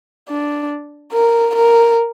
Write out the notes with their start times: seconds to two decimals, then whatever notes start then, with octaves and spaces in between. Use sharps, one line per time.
0.29 D4
1.13 A#4
1.55 A#4